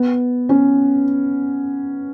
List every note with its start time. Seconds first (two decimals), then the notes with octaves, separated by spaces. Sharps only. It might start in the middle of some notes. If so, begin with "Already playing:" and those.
Already playing: B3
0.49 C#4